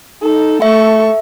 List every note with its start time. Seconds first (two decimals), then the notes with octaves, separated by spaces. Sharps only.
0.22 D#4 A4
0.62 A3 A4 E5 C#6